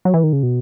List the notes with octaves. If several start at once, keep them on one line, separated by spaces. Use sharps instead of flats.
F#3
E3
D#3
C#3
B2